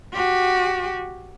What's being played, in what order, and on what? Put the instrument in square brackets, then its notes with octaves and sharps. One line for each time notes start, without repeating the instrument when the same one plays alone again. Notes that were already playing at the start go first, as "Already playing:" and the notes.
[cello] F#4 G4